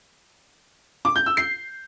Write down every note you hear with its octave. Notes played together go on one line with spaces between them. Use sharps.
D6
G6
E6
C7